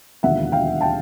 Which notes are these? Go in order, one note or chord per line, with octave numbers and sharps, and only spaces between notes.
E1 D#2 D3 F3 E5 F#5
F5 G5
G5 A5